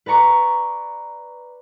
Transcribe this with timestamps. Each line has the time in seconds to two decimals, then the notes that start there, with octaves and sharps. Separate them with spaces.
0.06 B4 D5 A#5 C#6 D6